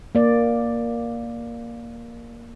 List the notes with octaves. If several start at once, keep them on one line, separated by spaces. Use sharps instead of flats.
A#3 D5